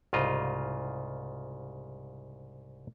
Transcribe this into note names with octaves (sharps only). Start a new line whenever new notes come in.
C2 G#2 C#3 F4 D#5